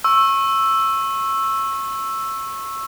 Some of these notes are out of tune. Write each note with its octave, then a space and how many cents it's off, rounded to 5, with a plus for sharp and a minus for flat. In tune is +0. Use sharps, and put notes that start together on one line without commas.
C#6 -25 E6 +0